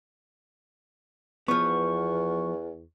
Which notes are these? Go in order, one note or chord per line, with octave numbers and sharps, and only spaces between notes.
E2 F3 B3 C#6